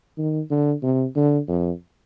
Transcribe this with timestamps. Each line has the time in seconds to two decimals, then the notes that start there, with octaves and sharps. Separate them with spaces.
0.18 D#3
0.50 D3
0.83 C3
1.16 D3
1.48 F2